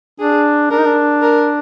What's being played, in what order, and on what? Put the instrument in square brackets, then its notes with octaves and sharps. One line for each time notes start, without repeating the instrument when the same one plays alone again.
[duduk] D4 [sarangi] G#4
[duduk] D4 [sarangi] A#4
[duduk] D#4
D4
[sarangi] A#4